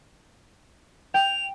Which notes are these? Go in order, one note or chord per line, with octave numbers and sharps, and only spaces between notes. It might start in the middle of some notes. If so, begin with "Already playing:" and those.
G5 F7